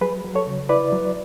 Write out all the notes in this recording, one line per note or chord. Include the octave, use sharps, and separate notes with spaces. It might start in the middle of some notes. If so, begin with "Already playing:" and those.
F#3 G#4 B4
F#3
A4 C#5
C#3
E4 B4 D5
F#3